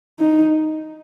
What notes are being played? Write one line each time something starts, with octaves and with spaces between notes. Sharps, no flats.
D#4